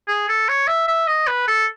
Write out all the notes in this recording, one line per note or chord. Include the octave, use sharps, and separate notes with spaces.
G#4
A4
C#5
E5
E5
D#5
B4
A4